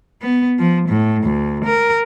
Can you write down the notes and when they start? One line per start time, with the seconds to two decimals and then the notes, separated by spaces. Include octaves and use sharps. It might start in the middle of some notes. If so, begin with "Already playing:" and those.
0.22 B3
0.59 F3
0.89 A2
1.24 D2
1.65 A#4